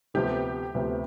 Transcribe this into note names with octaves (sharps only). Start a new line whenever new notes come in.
D2 C3 F3 B3 G4
D2 C3 F3 B3